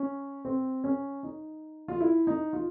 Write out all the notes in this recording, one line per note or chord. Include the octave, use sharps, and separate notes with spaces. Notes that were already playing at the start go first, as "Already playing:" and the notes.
Already playing: C#4
C4
C#4
D#4
F4
E4
D#4
F4